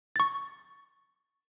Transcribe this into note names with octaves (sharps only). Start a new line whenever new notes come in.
C#6 A6